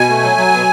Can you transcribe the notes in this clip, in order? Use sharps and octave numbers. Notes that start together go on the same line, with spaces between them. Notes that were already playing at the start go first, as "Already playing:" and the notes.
Already playing: B2 G#5
A3
F#3
F#3
B2